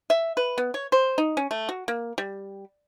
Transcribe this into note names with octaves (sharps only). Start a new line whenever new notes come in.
E5
B4
B3
C#5
C5
D#4
C#4
A3
F#4
A#3
G3